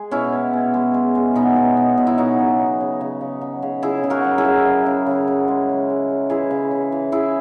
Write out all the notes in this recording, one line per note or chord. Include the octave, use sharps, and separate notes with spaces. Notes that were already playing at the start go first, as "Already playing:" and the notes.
Already playing: G#3 G#4
B2 C#4 E4
B2
B2
G#3
G#3
G#3
B2 B3 D#4
B2
B2
B2
E4
C#3 D#4 F#4
C#3
F#3
C#3
C#3
C#3
F#3
C#3
C#3 E4 G#4
C#3
F#4 A#4
F#3
E4 G#4
C#3
F#3
C#3
C#3
F#3
G#3
C#3
G#3
G#3
E3 E4 G#4
C#3
C#3
E3
E3 E4 G#4